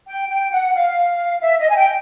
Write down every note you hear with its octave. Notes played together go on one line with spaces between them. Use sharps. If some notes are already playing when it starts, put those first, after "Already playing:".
G5
G5
F#5
F5
E5
D#5
G#5
G5